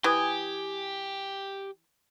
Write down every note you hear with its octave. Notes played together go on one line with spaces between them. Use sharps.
E3 G4 G#5 D#6